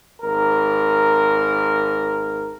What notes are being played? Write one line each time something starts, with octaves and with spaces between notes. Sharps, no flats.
G#1 A#4